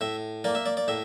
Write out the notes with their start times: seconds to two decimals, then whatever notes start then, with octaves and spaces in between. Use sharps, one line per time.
0.01 A2 E5
0.44 A#3 D5
0.55 E5
0.66 D5
0.77 D5
0.88 A2 E5